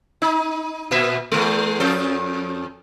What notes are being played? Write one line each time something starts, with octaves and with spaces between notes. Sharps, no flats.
D#4
A#2 E5
E2 G#3
F2 A4